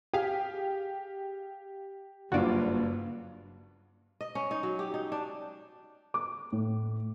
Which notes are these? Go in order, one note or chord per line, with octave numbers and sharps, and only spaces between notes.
G4 G#4 F5
F#1 G2 F#3 A#3 F4 F#4 D5
D#5
C#4
D#4
F#3
G4
D#4
D4
D6
A2